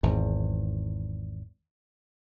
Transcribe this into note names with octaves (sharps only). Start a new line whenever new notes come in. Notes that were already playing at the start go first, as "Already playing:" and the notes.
G#1 E2